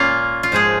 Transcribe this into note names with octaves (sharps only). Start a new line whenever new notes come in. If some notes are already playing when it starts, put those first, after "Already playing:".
Already playing: A#2 A#3 C#4 F4
F4
G#2 F3 G#3 D#4 G#4